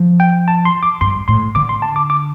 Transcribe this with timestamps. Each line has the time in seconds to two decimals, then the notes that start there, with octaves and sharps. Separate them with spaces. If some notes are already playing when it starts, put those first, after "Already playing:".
Already playing: F3
0.20 G5
0.48 A5
0.65 C6
0.83 D6
1.01 G2 C6
1.28 A2 C6
1.55 D3 D6
1.69 C6
1.82 A5
1.96 D6
2.10 D6